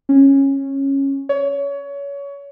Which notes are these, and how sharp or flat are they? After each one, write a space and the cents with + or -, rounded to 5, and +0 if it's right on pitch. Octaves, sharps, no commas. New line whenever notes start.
C#4 -15
C#5 +25